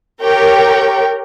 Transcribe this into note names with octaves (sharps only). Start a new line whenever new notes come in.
G4 A#4 C#5 G5